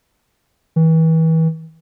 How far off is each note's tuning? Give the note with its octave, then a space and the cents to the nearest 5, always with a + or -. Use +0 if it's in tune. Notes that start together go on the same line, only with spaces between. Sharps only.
E3 -35